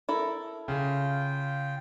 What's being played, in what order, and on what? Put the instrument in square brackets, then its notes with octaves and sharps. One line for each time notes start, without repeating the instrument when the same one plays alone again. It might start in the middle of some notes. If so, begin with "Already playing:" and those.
[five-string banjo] E4 A4 A#4
[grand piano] C#3 [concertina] F4 G5